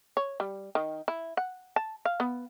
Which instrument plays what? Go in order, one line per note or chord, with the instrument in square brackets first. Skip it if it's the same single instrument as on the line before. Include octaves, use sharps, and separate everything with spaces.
[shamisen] C#5
G3
D#3
E4
F#5
A5
F5
B3